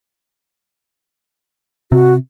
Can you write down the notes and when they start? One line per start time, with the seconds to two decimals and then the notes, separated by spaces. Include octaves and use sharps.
1.92 C3 F#4